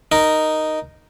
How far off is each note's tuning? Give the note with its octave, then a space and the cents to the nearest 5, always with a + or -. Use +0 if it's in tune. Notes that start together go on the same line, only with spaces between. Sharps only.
D#4 +0 A#4 +0